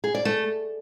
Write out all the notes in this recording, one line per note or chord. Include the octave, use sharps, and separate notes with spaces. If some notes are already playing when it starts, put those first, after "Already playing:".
G#4
D5
A3